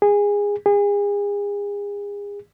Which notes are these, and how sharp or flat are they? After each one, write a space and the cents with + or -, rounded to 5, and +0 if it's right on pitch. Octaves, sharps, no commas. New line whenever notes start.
G#4 -20
G#4 -35